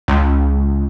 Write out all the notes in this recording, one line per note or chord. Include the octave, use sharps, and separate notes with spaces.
C#2